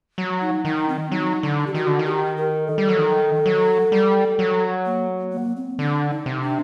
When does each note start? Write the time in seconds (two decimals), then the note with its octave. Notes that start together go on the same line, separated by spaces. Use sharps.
0.18 F#3
0.41 D#4
0.65 D#3 D#4
0.89 C4
1.11 F#3 D#4
1.43 D3 D4
1.67 G4
1.74 D#3 F#4
1.87 D3
1.99 D#3
2.05 G4
2.37 A#4
2.67 A4
2.78 G3
2.89 F#3
2.99 D#3
3.46 F#3
3.92 G3
4.39 F#3
4.86 A#3
5.32 A#3
5.56 C4
5.79 D3 D4
6.11 D#4
6.26 C3
6.42 D4